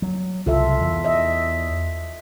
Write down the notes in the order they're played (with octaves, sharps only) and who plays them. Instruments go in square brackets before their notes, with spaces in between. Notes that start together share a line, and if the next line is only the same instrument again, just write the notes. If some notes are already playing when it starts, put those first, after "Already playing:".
[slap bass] F#3
[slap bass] C2 C#3 [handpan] F4 A4 E5
[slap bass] E2
[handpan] D#5 E5